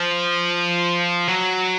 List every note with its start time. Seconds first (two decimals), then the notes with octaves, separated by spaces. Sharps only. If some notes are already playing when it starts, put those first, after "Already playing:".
Already playing: F3
1.28 F#3